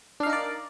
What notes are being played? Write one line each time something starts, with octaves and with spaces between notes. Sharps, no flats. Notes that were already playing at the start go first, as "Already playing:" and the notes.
D4 D#4 A#4 D5 F5